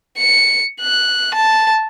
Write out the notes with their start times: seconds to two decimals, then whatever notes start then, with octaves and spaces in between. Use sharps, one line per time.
0.18 C#7
0.81 F#6
1.34 A5